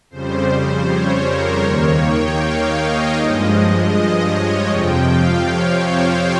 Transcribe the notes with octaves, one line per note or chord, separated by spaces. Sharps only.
F2 C#3 G3 C5
C#5
A#4
D#2 D#3 A#3 C#5
G5
F5
D#5
G2 F3 G#3 D#5
D#5
C#5
F2 C3 F3 G5
F5
C#5
C5